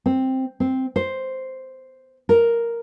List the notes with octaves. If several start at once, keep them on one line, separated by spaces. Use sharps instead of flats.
C4
C4
C5
A#4